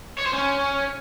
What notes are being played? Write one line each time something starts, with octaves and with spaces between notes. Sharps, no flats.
C#5
C5
C#4